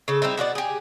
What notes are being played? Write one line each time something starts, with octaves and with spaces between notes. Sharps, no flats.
C#3 A4
G3 C4 D#4 E4
B2 F#4 A#4 D5
G4 G#4